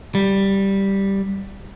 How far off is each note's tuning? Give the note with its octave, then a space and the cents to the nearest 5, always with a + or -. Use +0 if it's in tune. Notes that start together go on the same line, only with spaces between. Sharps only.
G3 +0